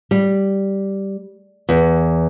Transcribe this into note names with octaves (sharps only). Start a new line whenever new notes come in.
G3
E2